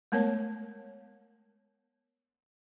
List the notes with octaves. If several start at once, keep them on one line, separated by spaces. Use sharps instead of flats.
G#3 A3 B3 A#4 C#5 A5